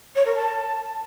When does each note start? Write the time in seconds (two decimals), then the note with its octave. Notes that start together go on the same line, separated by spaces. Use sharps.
0.15 C#5
0.25 A#4
0.35 A5